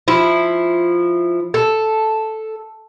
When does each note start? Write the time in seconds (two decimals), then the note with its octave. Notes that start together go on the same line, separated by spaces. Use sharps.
0.08 F3 E4
1.54 A4